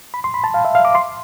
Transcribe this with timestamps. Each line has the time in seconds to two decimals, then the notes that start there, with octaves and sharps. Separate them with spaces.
0.14 B5
0.24 C6
0.34 B5
0.44 A5
0.54 F5
0.65 E5
0.75 F5
0.85 D6
0.95 C6